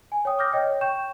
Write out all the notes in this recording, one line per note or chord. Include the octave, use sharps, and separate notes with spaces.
G#5
C#5 G5 D#6
D6 F6 G6 A#6
C#5 D#5 G5
C#5
G5 C#6 G6 E7